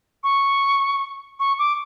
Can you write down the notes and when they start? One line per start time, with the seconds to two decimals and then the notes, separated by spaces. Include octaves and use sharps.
0.24 C#6
1.40 C#6
1.59 D6